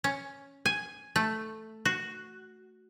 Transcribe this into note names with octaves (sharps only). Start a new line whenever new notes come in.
C#4
G#5
A3
F#4